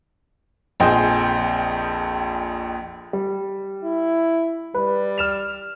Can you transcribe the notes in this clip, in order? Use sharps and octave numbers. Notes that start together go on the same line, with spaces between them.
A#1 F2 G#4 C5 D#5 G5
G3
E4
G3 B4
F6 E7 F7